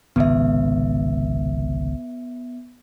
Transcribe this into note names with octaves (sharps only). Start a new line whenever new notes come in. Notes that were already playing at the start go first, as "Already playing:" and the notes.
G#1 C#2 C3 B3 E5